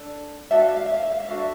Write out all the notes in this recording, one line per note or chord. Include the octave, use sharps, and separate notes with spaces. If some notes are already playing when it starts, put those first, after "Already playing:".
Already playing: D4 A4
D4 F#4 A4 E5
F5
E5
F5
E5
F5
E5
F5
E5
D4 F#4 A4 F5
E5